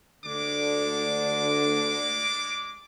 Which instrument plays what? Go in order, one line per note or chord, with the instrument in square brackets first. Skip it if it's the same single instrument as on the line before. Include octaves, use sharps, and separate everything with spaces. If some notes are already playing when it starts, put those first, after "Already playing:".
[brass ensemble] D2 D3 [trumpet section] G#3 D4 D6